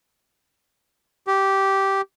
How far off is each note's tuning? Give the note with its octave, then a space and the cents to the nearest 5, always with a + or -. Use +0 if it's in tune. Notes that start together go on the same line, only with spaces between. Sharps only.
G4 -10